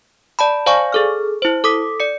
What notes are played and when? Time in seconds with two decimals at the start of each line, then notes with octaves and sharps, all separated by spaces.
0.39 D5 A5 B5
0.66 C5 D5 F5 G#5 C#6
0.92 G#4 A4 F6
1.42 E4 C5
1.64 A4 D6 D#6 B6
2.00 D5 C#7